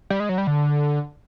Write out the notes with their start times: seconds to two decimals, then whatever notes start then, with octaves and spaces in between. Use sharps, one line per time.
0.10 G3
0.20 G#3
0.29 F#3
0.38 G3
0.47 D3